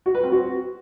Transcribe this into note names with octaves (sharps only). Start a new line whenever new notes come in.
F#4
B4
C4
F#4